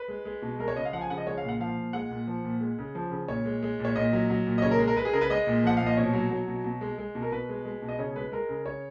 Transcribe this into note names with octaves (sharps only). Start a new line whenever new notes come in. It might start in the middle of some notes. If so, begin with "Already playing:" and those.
Already playing: B4
G#3
G#3
B2
G#3 A#4
C#5
C#3 D#5
F5
F3 F#5
G#5
C#3 F#5
D#5
G#3 C#5
F5
A#2
F#5
F3 F5
A#2
G#3 F#5
A#2
F3
A#2
G#3
C#3
F3
C#3
A#2 C#5
G#3
G#3
A#2
C#5
A#2 D#5
F#3
F#3
A#2
D#5
C#3 C#5
A#4
G#3
A#4
G#3 B4
G#4
C#3 A#4
B4
G#3 D#5
A#2
F3 F#5
A#2 F5
D#5
B2 C#5
F#3
F#3
B2
B2
G#3
G#3
B2
A#4
B2 B4
G#3
G#3
B2
D#5
C#3 C#5
G#3 B4
G#3 A#4
C#3
C#3 C#5